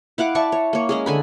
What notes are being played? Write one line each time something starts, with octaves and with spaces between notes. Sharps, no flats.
E4 F5 F#5 D6
D5 E5 A5 C#6
C#5
A#3 C#5
G#3 C#4 G#4
D3 G#5 B5